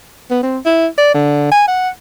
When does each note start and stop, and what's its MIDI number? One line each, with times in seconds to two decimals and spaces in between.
0.31 0.41 59
0.43 0.58 60
0.66 0.87 64
0.98 1.13 74
1.15 1.51 50
1.52 1.65 80
1.68 1.89 78